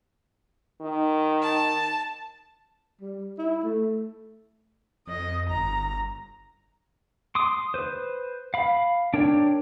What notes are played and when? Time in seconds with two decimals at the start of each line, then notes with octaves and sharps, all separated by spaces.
0.81 D#3
1.42 A5
3.01 G3
3.39 E4
3.64 A3
5.07 F2 D#5
5.49 G1 A#5
7.35 C6 D6 D#6
7.74 B4 C5
8.54 F5 B5
9.14 D4 A#4 C#5 G5